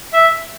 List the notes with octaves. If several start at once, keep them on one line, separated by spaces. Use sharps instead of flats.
E5